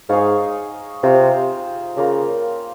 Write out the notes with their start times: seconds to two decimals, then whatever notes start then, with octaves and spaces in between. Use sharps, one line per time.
0.09 G#2 D#4 G#4 C#5 F5
1.03 C3 C4 F4 C5 F5
1.96 C#3 A#3 F4 A#4